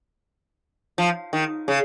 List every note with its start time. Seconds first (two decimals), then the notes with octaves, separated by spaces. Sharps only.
0.98 F3
1.33 D#3
1.68 C#3